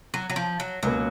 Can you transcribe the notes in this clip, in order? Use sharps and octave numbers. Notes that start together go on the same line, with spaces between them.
F#3
F#3
F3
F#3
C#2 B2 F#3 A#3